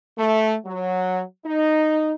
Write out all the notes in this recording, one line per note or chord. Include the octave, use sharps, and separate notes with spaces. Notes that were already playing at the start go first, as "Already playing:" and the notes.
A3
F#3
D#4